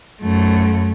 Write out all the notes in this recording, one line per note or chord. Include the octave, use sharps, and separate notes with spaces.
F#2 A3